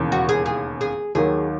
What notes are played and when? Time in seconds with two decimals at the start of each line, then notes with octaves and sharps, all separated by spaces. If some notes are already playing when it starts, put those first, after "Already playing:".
Already playing: E1 D#2 C#3 E3 A#3
0.12 F#4
0.29 G#4
0.46 G#4
0.81 G#4
1.15 D#2 D#3 F#3 G#4